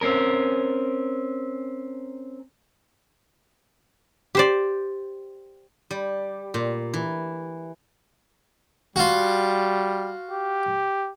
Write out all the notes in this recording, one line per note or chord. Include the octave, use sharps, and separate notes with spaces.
C4 C#4 A#4
G4 C5 D5
G3
A#2
E3
G3 F4 F#4
G4